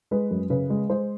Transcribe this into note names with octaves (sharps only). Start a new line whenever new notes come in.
G#3 B4
F#2
C#3 B4
G#3
G#3 C5